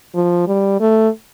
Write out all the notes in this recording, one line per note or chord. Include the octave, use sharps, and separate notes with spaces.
F3
G3
A3